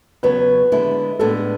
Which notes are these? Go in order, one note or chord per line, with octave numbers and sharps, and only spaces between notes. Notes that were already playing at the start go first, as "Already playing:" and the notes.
E2 C#3 F#3 B3 B4
D3 G#3 B3 E4
A2 G#3 B3 D4 A4